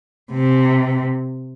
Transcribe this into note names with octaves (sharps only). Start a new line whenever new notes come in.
C3